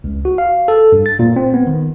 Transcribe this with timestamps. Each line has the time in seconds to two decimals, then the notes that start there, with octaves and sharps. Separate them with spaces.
0.04 C#2
0.25 F#4
0.38 F5
0.68 A4
0.92 G2
1.06 A6
1.19 A#2
1.36 C4
1.54 B3
1.67 D#3